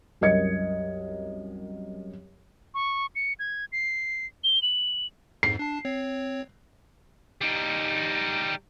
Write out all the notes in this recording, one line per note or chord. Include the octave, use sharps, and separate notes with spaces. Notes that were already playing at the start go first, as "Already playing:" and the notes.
C2 F#2 A#4 D#5 G#6 C#7
C#6
C#7
G#6
C7
G7
F#7
F2 G#2 C7
D4 A5
C4 C#5
G3 D#4